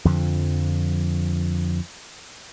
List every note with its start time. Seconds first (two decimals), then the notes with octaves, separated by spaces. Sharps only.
0.05 F2 D3 F3